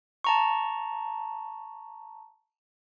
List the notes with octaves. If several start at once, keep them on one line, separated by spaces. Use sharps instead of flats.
A5 A#5 C#6